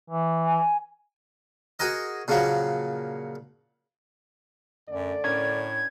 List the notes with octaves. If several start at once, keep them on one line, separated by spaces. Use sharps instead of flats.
E3
G#5
F#4 G#4 A#4 D#5
A#2 C#3 F3 F#3 A#3
F#2 D3 A3 D5
A2 C#4 D4 A#4 G#6